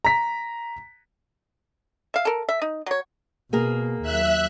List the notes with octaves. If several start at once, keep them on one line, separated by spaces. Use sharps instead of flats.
A#5 B6
E5 F5
A4 A#4
E5
D#4
F#3 C#5
B2 A#3 G#4 A#4
D#2 F#3 E5 F#6